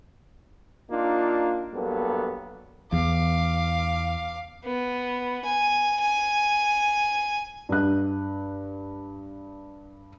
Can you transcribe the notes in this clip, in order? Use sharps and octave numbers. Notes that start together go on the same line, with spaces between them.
A#3 D4 D#4 F4
G2 F#3 A#3 B3 A4
E2 F5 D6
B3
G#5
G#5
G2 F#6